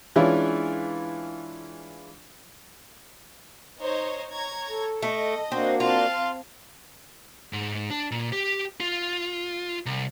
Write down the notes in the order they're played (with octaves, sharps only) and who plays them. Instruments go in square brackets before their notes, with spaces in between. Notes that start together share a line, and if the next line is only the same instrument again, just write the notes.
[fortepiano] E3 G#3 C#4 D4 E4 F4
[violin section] D#4 C5 C#5
C#5 A#5 G#6
[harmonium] A4
[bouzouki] A3 [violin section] D#5
[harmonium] A#3 D4 F#4 [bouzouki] C4
[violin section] C4 F5 A5 [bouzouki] F4
[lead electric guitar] G#2
D4
A#2
G4
F4
C2